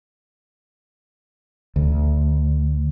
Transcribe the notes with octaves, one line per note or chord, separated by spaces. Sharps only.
D2